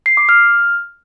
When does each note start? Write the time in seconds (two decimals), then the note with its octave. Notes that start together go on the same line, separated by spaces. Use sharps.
0.06 C7
0.17 D6
0.29 F6